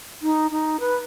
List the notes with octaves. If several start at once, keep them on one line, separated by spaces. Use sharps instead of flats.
D#4
D#4
B4